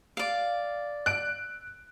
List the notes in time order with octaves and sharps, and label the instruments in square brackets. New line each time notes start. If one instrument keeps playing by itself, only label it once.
[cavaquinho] D5 F5
[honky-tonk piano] F#6 D7